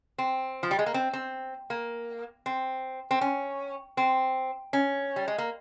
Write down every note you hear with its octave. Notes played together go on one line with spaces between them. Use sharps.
C4
F3
G3
G#3
A#3
C4
C4
A#3
C4
C4
C#4
C4
C#4
G3
G#3
A#3